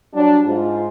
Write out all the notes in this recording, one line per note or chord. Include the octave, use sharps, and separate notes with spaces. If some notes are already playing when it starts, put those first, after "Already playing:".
F#3 G3 D4
G#2 F4